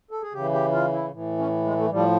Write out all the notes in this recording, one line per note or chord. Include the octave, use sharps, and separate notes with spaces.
A4
G#4
C#3 E3 G4
G4
F4
E4
A2 E3
C#4
G#3
A3
A2 F3 G3